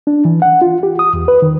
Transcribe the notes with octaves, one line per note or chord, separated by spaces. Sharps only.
D4
E3
F#5
F4
G4
D#6
E2
B4
D#3